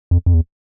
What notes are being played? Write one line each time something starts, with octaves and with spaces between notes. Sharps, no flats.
F2
F2
E2